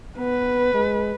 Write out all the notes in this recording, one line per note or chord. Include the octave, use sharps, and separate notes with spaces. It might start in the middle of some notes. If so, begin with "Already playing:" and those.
B3 B4
G#3